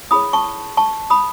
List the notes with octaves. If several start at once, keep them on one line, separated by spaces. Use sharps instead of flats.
E4 G#4 C#5 B5 D#6
A5 C#6
A5 C#6
B5 D#6